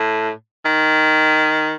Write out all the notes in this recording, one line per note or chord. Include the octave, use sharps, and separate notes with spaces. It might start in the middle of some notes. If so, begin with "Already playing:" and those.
Already playing: A2
D#3